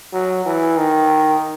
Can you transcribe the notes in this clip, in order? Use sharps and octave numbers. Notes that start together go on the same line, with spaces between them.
F#3
E3
D#3